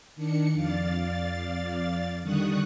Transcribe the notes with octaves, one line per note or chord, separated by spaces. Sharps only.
D#3 D4 C#7
F2 D5 F5 A6
D3 D#3 G3 C#6 D#6 F#6